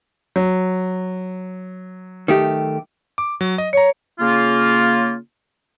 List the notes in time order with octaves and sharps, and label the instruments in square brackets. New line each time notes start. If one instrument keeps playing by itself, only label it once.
[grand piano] F#3
[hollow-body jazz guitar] D#3 A3 G4
[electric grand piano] D6
F#3
D#5
[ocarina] C#5 [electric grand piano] A#5 C#7
[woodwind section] C#3 A#3 F4